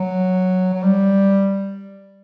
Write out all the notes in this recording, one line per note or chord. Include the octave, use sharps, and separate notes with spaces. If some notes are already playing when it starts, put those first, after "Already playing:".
Already playing: F#3
F#3
G3